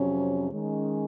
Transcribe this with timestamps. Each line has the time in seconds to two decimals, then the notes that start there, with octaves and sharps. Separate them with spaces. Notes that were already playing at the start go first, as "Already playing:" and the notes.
Already playing: F2 C3 F#3 C#4
0.51 D#3 G#3 C#4